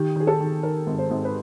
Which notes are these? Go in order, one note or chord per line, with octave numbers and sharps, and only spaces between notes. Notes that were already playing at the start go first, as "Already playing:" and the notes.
Already playing: D#3 G4
D#3 G#4
A4
D#3
D#3 A#4
G#1
C5
G#1
B4